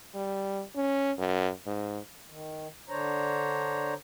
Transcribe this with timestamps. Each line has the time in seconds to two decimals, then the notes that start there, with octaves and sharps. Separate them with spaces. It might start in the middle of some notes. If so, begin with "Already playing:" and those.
0.14 G3
0.76 C#4
1.18 F#2
1.67 G#2
2.28 D#3
2.89 D3 D4 C5 C#5 A#5